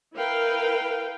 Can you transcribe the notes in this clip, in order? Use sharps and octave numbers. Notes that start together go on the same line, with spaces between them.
E4 A#4 B4 F5 G5